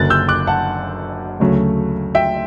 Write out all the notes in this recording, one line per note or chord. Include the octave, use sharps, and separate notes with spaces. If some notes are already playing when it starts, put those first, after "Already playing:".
Already playing: F#1 F#2 D3 F#6 A6
E6 G6
D6 F#6
F#5 A5
D2 C#3 F#3 A3
E5 G5